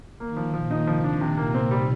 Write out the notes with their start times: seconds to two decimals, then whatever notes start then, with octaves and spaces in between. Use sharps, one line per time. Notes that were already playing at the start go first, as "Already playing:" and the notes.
0.20 D#3 A#3
0.37 F3
0.53 A#2 F3
0.71 D#4
0.87 C3 F3
1.04 D4
1.21 C3 D#3
1.37 A#3
1.55 C4
1.71 G3